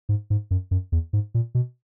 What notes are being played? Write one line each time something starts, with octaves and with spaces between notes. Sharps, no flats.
G#2
G#2
F#2
F#2
E2
G#2
A#2
B2